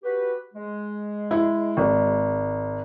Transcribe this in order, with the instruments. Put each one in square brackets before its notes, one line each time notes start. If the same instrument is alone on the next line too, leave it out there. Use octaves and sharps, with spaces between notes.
[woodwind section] F#4 G4 B4
G#3
[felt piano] E4
G#1